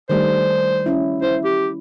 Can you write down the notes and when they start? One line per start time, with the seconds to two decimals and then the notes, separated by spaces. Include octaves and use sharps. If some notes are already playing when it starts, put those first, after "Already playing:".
0.10 D#3 G3 A3 C5
0.86 C#4 E4
1.22 E4 C5
1.45 G4